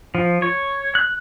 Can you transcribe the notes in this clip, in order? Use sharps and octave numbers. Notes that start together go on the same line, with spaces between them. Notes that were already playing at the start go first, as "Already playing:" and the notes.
F3
C#5
F#6